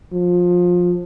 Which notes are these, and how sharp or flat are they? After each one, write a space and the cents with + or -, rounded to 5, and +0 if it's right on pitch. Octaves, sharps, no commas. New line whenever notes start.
F3 +20